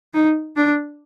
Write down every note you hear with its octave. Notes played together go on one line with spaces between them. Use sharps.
D#4
D4